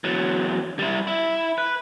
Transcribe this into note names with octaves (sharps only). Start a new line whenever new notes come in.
E2 F#3
G3 E4
E4
B4